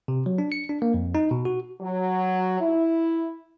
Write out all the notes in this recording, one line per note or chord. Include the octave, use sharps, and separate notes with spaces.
C3
F#3
D4
C#7
D4
A#3
F2
D#4
B2
F#4
F#3
E4